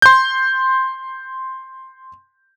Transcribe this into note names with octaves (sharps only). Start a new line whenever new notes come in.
C6 G6